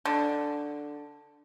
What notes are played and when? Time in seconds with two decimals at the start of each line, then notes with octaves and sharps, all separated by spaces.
0.05 D3